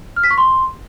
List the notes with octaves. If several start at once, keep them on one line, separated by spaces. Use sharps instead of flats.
F6
B6
C#6
C6